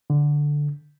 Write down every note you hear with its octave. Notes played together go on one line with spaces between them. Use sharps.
D3